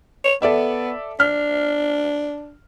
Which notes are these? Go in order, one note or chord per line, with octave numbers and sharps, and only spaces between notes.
C#5
B3 A4 D5 E5
D4 F6